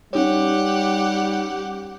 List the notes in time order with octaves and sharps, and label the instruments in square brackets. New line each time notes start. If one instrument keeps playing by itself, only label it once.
[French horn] G3 [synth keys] C#4 D#4 C#5 [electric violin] G4 F#5